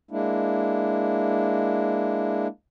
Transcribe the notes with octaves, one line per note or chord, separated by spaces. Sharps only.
G#3 A#3 D4 E4